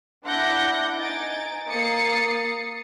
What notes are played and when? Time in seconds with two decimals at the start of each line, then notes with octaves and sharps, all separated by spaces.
0.24 D4 E4 F#5 D6 G6 A#6
0.98 D#4 G#5 A6 D7
1.69 A#3 D#6 A6 C7 C#7